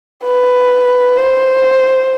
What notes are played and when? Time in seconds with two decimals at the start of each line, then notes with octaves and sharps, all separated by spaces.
0.23 B4
1.17 C5